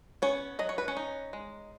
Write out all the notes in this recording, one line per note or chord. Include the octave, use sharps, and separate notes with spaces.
B3 C#4 C#5
F#3 D#5
C#5
B4
C#4 C#5
D#4
G#3